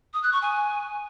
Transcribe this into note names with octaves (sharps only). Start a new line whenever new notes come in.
D#6
F#6
C#6
G#5